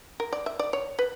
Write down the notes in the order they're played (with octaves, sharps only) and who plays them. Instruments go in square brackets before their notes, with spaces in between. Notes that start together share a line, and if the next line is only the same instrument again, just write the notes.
[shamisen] A#4
D5
E5
D5
C#5
B4